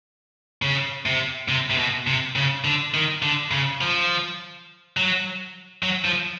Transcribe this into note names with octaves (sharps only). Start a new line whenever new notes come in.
C#3
C3
C3
C3
B2
C3
C#3
D3
D#3
D3
C#3
F3
F#3
F#3
F3